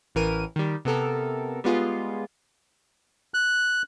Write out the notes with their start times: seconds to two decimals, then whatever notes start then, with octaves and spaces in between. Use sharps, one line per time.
0.15 A1 E3 A#4 D#7
0.56 D#3 G3
0.85 C3 B3 A4 A#4
1.64 G3 G#3 B3 F4 G#4
3.34 F#6